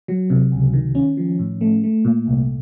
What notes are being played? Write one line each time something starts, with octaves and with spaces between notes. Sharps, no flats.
F#3
C3
C#2
D#3
C#4
F3
A2
A3
A3
A#2
C2